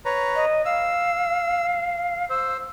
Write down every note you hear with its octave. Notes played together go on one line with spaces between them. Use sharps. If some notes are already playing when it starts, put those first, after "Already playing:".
B4 C#5 A#5
D#5
F5 E6
C5 E6